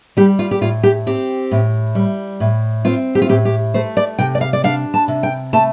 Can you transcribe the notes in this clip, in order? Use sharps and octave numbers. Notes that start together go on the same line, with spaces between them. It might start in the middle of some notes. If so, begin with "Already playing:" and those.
G3 G4
F4
G4
A2 F4
G4
C4 G4
A2
G3
A2
C4 F4
G4
F4
A2 G4
G4
A3 C5
D5
C3 G5
D5
F5
D5
D4 F5
A5
C3
G5
A3 A5